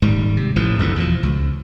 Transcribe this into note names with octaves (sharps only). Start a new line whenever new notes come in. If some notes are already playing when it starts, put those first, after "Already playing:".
D#1 G#2 G3
C3
A1 A2 E3 F3
F#1 C2 F#2 D3
E2 B2 D3 F3
C#2